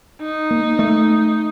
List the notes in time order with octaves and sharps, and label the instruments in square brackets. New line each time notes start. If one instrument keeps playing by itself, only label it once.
[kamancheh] D#4
[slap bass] A#3
A3